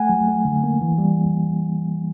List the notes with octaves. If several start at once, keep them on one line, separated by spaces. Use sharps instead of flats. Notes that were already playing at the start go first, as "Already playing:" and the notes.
Already playing: A3 F#5 G#5
F#3
A3
D3
A#3
E3
G3